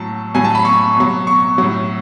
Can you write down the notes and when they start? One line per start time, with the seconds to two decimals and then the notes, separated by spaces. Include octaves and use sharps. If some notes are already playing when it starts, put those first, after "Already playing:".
Already playing: A2 F#3 A5
0.35 A2 F#3 G#5
0.44 A5
0.55 B5
0.65 C#6
0.96 B2 F#3
1.27 C#6
1.58 A2 F#3